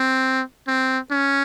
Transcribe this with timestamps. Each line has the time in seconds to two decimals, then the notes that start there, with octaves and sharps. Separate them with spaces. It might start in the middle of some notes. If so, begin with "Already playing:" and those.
Already playing: C4
0.68 C4
1.12 C#4